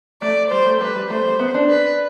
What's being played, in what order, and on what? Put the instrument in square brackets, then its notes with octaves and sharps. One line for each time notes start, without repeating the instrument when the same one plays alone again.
[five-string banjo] A3 [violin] D5
[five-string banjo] G3 [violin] C5
[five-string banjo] A3
[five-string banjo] G3 [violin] B4
[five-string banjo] G3
[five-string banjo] A3 [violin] C5
[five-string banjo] G3
B3
D4
[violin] B4